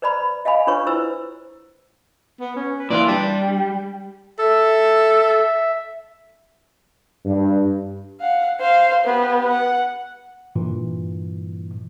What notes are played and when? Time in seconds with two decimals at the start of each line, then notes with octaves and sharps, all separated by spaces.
0.02 B4 C5 D5 A#5 B5
0.45 D#5 F5 G#5 B5
0.67 D4 F4 B4 C#5 C#6
0.87 E4 B4 C5 E6
2.40 B3
2.56 C#4
2.79 B4
2.90 A#2 E3 F4 D5
3.08 G3 D4
4.39 A4 E5
7.26 G2
8.20 F5 F#5
8.60 C5 F5
9.05 B3 G4
9.47 F#5
10.55 G2 A#2 E3